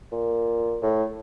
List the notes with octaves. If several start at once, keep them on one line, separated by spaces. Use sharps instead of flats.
A#2
A2